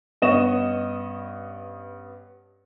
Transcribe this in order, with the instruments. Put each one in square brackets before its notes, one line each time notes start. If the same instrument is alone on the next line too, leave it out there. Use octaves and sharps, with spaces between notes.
[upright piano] G2 B3 C#4 D#5 C#6 E7